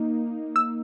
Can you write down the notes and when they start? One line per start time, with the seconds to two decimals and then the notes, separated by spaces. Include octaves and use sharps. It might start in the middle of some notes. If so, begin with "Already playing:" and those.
Already playing: A#3 D#4
0.56 E6